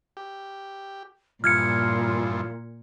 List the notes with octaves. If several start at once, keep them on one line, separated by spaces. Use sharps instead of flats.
G4
G2 A#2 E3 F3 F4 F6 G#6 C#7